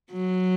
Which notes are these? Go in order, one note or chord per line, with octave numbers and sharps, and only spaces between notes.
F#3